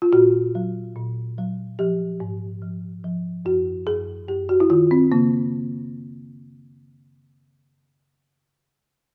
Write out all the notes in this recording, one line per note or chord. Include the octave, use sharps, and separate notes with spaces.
F4
A#2 F#4
F#3
A#2
F#3
F3 G4
G#2
F3
F3
F#2 F#4
F#2 G#4
F#2 G4
F#4
E4
D#3 F4
C4
C#3 A#3